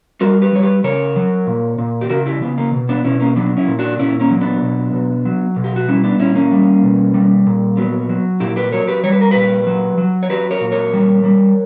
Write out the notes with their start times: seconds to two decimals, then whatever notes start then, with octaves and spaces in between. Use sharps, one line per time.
0.21 G3 F#4 A#4
0.42 G4 B4
0.53 G3 C#5
0.63 G4 B4
0.84 C#3 A#4 C#5
1.16 F#3
1.47 A#2
1.78 A#2
2.01 G4
2.10 C#3 F#4 A#4
2.26 E4 G4
2.42 C#3 B3
2.58 A#3
2.73 B2
2.89 B3 D4
3.05 B2 C#4 E4
3.20 A#3 C#4
3.36 F#3 B3 D4
3.57 C#4 E4
3.68 A#2
3.79 D4 F#4
3.99 A#2 C#4 E4
4.20 A#3 C#4
4.31 F#3
4.41 B3 D4
4.62 B2
4.93 B2
5.25 F#3
5.56 B2
5.64 G4
5.76 F#4
5.88 G3 C#4 E4
6.04 B3 D4
6.19 A#2 C#4 E4
6.35 A#3 C#4
6.52 G3
6.83 B2
7.14 G3
7.47 A#2
7.77 F#3 B3
8.09 F#3
8.40 A#2 E4 G4
8.56 G4 B4
8.72 F#3 A#4 C#5
8.87 G4 B4
9.04 G3 C#5
9.12 B4
9.21 A#4
9.31 A#2 G4 B4
9.67 F#3
9.98 F#3
10.23 C#5
10.30 F#3 G4 B4
10.51 A#4 C#5
10.61 A#2
10.72 A#4 C#5
10.93 G3
11.24 G3